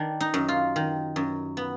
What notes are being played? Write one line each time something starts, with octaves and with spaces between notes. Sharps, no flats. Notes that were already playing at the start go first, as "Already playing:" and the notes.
Already playing: D#3 D4
D#4
F#2
F4
D#3
F#2
B3